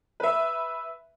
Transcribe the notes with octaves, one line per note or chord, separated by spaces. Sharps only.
B4 E5